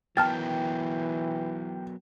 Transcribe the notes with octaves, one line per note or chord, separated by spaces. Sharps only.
E3 F#3 B3 A#4 G5 A5 F6 A6